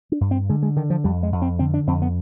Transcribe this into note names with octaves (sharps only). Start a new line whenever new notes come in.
D4
G2
C4
D3 G#3
G#3
D3 D#3
F3
F2 G3
G#3
F2
C4
D3 C4
D4
F2 C4
B3